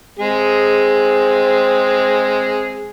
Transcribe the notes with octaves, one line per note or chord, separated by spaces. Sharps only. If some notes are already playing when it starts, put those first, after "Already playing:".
G#3 C4 G#4